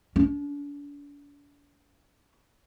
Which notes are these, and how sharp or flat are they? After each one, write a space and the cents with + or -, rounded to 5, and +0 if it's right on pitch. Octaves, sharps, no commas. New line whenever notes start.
D4 -40